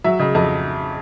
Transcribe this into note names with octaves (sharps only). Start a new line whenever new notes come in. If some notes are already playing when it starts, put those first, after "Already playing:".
F#3 E5
C#3 D#5
F2 D#5